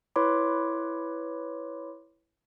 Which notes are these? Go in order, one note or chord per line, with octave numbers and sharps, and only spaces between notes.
E4 B4 C#5 B5 C6 D6